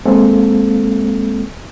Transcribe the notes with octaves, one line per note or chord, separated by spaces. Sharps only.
G#3 A#3 C4 A4 F5